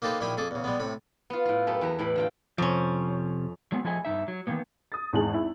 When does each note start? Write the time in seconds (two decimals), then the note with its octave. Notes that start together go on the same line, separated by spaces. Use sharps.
0.02 A#3 D#4 G4 A4 B4 C5
0.21 A#1 D#3 E4 G4 G#5 B5
0.37 F2 G#4 A4 D6
0.51 E2 C#3
0.64 G3 G#3 B3
0.80 A2 C3 B5
1.30 B3 F4
1.45 A2 F4
1.67 F#2 B3 G4 A4
1.81 E2 G4 A#5
1.99 A2 E3 D5 B5
2.16 D3 F4 G5
2.58 F2 C3 F3 C#4
3.72 F#3 G#3 B3 C4
3.85 F3 A3 E4 G#4 D#5 G#5
4.05 G2 D#3 D#4 E5
4.28 F#3
4.47 D#3 E3 A#3 B3
4.92 D#6 A6
5.13 G#1 E2 G#3 G#4 A5 F#7
5.34 E4